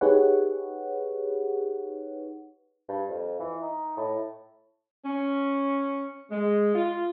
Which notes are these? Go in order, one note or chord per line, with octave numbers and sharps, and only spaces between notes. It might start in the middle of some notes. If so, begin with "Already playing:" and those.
D#4 G4 G#4 B4 C#5 F#5
G2
F2
E3
D#4
A2
C#4
G#3
F4